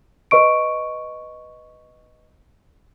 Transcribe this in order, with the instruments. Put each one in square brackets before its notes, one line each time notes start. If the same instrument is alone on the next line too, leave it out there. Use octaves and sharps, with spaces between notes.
[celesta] B4 D#5 C#6 D7